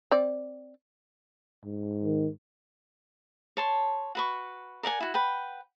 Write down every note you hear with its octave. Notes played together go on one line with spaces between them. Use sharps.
C4 D5
G#2
D#3
C#5 A5 C6
F#4 B4 C#6
A#4 D5 F#5 G#5
E4 F#4
B4 F#5 G5